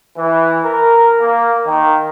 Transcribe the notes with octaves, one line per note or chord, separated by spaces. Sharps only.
E3
A#4
A#3
D#3